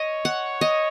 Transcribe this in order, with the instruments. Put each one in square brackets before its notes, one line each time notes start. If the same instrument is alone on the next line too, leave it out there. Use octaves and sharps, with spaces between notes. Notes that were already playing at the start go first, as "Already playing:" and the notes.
Already playing: [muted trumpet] C#5 [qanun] D#5
[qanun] F#5
D#5